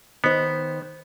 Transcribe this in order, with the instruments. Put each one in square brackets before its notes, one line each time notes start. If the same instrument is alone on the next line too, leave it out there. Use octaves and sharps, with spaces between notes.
[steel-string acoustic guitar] D#3 C5 [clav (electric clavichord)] B3